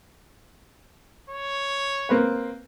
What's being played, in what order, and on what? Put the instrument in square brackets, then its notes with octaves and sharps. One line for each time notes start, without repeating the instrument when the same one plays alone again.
[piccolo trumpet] C#5
[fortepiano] A#3 C4 B4